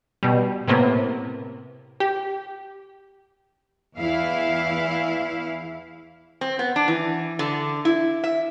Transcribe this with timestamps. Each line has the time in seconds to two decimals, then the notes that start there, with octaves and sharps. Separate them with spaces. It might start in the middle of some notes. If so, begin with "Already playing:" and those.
0.23 B2 G3
0.68 A2 C3 A#3 B3
2.00 G4
3.97 E2 E3 E4 F5
6.41 C4
6.59 B3
6.76 D4
6.88 E3
7.39 D3
7.85 E4
8.24 E5